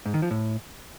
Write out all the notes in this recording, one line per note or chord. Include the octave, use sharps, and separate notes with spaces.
G#2
D#3
F3
A2